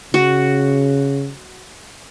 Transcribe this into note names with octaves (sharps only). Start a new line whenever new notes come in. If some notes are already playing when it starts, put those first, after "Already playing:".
C#3 F#4